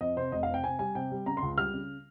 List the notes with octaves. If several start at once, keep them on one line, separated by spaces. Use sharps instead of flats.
F2 D#5
C3 C5
F1 D#5
F5
C3 G5
C3 G#5
G3 G#5
C3 G5
G3
C#3 A#5
C6
C#2
G3 F6
C#3